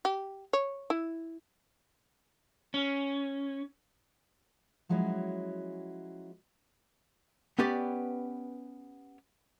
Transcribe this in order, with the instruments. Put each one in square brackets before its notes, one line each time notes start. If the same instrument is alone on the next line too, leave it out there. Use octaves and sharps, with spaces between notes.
[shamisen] G4
C#5
E4
[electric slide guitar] C#4
[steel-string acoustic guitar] F3 F#3 G#3 C#4 E4 F#4
[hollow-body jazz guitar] B3 C#4 G4 B4 D5